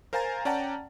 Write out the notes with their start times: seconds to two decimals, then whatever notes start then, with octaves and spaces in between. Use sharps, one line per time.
0.13 A#4 C5 F5 G#5 A#5 A6
0.45 C#4 D5 F#5 G5 A5 A#5